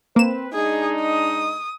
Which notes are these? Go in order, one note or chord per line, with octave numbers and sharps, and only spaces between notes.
A#3 C4 B4 E7
G#3 D4 D#4 G#4
D#6